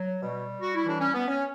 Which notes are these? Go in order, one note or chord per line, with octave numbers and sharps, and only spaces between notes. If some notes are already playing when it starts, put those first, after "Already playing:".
Already playing: F#3
B2 G3
F#4
E4
A2 E3 D4
C#4
B3
C#4